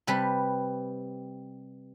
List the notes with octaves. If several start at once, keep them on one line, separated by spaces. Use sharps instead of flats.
C3 G3 B4 A5